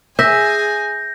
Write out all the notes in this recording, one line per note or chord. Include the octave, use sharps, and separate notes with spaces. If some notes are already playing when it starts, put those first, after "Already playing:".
G#4 E5 G#5 G6 A#6